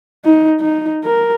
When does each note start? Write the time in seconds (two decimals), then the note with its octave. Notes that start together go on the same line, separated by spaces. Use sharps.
0.25 D#4
0.60 D#4
1.04 A#4